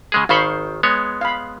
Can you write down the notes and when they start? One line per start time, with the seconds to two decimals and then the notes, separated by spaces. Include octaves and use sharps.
0.12 C#3 G#3 G#4
0.29 G#1 D#3 C5 F5 B5 C#6
0.83 G#3 B3 C#5
1.21 F5 B5